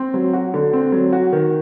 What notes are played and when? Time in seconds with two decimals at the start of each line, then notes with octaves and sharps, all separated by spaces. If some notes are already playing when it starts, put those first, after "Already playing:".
Already playing: C4
0.14 F#3
0.33 F#4
0.54 D3
0.73 C4
0.92 F#3
1.13 F#4
1.32 D#3